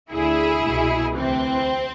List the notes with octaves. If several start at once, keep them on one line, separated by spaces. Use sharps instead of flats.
D2 D3 E4 G#4
C2 B2
D2 C3 E3 C4